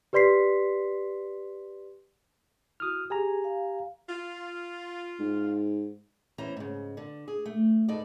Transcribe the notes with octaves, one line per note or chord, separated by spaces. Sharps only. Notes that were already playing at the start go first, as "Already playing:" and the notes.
G4 B4 D5 C6 B6 C7
E4 F#4 D#6 F6
G4 G#4 G#5 A#5
F5
F4
G#2
E2 E3 C#4 C5 A#5
G#2 C#3
D3
G#4
A3
D2 G#2 D#4 A4 B4 D5